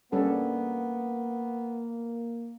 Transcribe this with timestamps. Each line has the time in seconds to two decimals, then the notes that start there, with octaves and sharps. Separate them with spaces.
0.12 G3 A#3 B3 C#4 A4